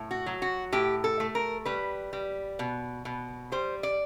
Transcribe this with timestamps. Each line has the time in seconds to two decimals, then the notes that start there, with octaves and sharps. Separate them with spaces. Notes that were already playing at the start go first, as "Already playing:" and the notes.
Already playing: A2
0.11 F#4
0.26 F#3
0.42 F#4
0.72 A2 G4
1.04 A4
1.20 A3
1.35 A#4
1.65 G3 B4
2.13 G3
2.59 B2
3.05 B2
3.52 G3 C5
3.83 D5